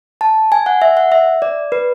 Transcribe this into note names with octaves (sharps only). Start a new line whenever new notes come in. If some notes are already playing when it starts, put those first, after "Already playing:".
A5
G#5
F#5
E5
F#5
E5
D5
B4